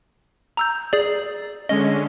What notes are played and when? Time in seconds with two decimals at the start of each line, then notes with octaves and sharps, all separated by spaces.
0.57 A#5 E6 G6
0.93 G#4 D5
1.69 D3 G#3 C#4 D#5